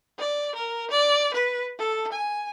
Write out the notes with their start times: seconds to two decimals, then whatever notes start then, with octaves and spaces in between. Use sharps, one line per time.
0.19 D5
0.55 A#4
0.91 D5
1.34 B4
1.79 A4
2.12 G#5